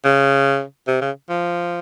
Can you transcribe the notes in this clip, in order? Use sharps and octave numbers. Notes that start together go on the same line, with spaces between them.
C#3
C3
C#3
F3